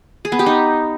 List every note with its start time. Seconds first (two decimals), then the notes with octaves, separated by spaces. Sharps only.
0.25 G#4
0.32 B3
0.39 G4
0.46 D#4